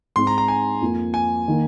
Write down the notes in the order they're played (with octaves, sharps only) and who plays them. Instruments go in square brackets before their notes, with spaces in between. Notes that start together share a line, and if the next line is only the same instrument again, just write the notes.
[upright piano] G#2 G#3 C4 D#4 [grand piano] C6
[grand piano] A#5
A#5
G#5
[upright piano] F2 F3 A#3
[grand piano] G#5
[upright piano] D#3 A#3